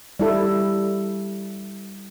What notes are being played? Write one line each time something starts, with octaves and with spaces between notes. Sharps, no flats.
G3 E4 A4